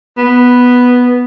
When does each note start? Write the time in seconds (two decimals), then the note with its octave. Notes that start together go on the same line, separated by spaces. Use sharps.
0.18 B3